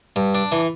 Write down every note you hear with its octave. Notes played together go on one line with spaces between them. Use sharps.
G2
D4
E3